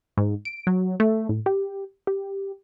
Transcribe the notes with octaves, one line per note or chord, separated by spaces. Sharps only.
G#2
D7
F#3
A3
A2
G4
G4